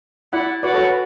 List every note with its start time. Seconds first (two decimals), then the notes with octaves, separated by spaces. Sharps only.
0.33 E4 D5 F#5
0.63 F#4 B4 D5
0.74 A4 C#5
0.84 B4